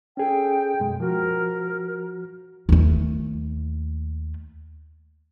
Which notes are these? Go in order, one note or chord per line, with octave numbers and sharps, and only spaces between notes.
C#4 G#4 A4 G5
F#2 B2 G#3
F3 F#4 A#4
D#2 A3